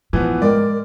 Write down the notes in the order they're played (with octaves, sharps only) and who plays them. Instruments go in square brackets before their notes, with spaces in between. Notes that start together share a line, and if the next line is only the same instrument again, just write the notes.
[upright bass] A2 [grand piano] E3 F3 B3
[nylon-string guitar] G#3 G5 [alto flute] A#4 [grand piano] D5